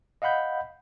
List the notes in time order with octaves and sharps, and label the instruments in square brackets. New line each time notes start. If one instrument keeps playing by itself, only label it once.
[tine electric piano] D#5 F5 F#5 B5 G6